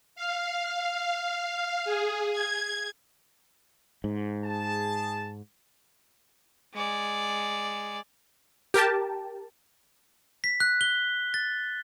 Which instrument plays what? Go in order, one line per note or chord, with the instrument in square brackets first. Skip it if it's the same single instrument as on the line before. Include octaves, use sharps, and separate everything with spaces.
[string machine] F5
G#4
G#6
[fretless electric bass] G#2
[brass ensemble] G#4 A5
[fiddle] G#3 D5
[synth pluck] G4 A#4 G5 A5
[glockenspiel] B6
F#6
G7
A6